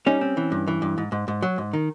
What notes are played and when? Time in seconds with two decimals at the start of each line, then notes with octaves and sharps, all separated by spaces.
0.06 G3 C#4 D#4
0.21 C4
0.37 E3
0.52 G2
0.68 E3
0.82 G2
0.98 G#2
1.12 G#2
1.28 G#2
1.42 F#3
1.58 G#2
1.73 D#3